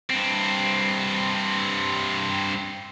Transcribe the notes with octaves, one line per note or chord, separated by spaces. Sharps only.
G2 C4